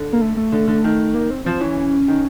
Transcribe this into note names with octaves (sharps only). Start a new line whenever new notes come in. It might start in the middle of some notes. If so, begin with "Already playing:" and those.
Already playing: D3
A#3
A3
A3
D3
D3
D#3
A#3
C4
F3 C4
E3 C#4
D#3